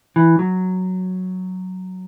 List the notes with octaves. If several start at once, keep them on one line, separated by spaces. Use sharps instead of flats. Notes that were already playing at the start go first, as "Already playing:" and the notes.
E3
F#3